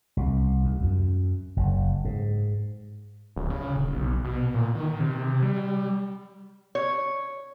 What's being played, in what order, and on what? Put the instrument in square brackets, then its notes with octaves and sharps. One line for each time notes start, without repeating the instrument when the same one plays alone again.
[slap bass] C2
D#2
F#2
F#1
G#2
[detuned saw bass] D1
C#3
D#1
B1
B2
A#2
D#3
C3
G3
[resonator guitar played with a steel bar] C#5